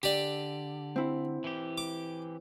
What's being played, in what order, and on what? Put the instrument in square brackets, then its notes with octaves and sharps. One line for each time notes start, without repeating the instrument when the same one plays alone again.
[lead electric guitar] D3 [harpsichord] G4 D5
[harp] C4 E4
[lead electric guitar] E3 G4
[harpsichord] D6